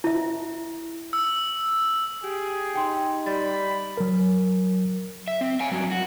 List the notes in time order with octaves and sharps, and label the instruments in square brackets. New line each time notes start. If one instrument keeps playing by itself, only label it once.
[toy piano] E4 E5
[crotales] E6
[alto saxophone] G4 [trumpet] G#4
[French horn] D#4 [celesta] G5 C6
[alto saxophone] G3 [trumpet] B5 [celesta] A6
[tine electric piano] F#3 A#4
[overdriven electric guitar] E5
C4
F5 G#5
G2 F#3
F#4